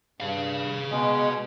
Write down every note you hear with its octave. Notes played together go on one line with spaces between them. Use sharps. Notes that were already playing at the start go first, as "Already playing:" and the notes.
G2 G#4 F5
B2 G#3